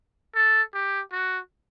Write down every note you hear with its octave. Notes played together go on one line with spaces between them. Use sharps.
A4
G4
F#4